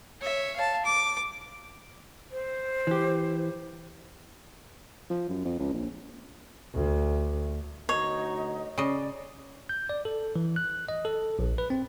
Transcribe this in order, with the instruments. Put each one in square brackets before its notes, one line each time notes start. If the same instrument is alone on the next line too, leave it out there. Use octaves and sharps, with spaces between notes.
[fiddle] C#5 E5
F5 A5
D6
[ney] C5
[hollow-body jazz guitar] E3 G4
[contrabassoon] F3
F#2
F2
C#2
A#1
[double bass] D2
[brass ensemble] D2 D#4 F#4 [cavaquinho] C#5 [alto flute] D#5
[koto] C#3 D#5 [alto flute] D5
[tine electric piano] G6
D5
A4
E3
F#6
D#5
A4
A#1
B4
C4